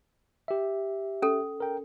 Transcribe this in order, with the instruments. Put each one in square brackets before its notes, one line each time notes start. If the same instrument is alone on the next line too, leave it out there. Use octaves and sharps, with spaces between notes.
[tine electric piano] G4 E5
[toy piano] C#4 A4
[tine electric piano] A#4 G5